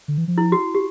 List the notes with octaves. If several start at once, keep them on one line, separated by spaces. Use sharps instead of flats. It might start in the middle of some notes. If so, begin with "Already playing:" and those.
D3
E3
F3
E4
F#4
G4